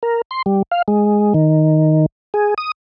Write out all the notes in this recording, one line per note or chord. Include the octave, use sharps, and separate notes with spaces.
A#4
C6
G3
F5
G#3
D#3
G#4
D#6